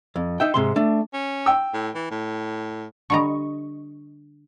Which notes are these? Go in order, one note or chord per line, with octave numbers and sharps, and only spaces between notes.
F2
D#4 E5 G5
G#2 C3 C6
A3 D4
C#4
G5 E6
A2
E3
A2
D3 G3 D#5 A#5 C#6